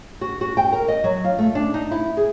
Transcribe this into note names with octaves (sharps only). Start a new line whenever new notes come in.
F#4
F#4
G5
A#4
D#5
F#3
F4
A3
D4
D#4
E4
G#4